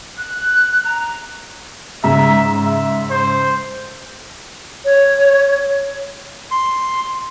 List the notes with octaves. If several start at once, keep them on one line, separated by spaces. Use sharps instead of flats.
F#6
A#5
G#2 C#3 E5 A#5
E5
C5
C#5
C6